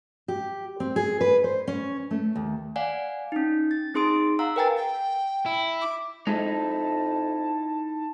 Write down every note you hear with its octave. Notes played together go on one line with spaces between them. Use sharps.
G4
C4
G#4
B4
C5
C#4
A3
D#2
D5 F5 F#5 G#5
C#4 D#4
A6
C4 D#4 G#4 C6 D#6 D7
F5 F#5 A#5 E6
A#4 B4 G5 G#5 A#5 A6
G5
E4
D6
F2 G#3 D#4 E4 A5